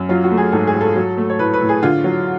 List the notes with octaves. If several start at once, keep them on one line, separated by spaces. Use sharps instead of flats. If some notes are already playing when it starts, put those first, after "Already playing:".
Already playing: F#2
F#3 F4
F#4
A3
G#4
G#2 A4
G#4
G#2
A4
F#3
A3
C#5
A2 B4
B4
A2
G#4
D3 F4
F#3